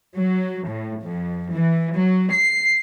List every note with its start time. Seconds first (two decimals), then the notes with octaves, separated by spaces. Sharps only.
0.17 F#3
0.67 A2
1.03 F2
1.53 E3
1.95 F#3
2.33 C7